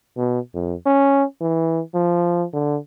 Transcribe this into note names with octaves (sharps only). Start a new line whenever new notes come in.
B2
F2
C#4
E3
F3
D3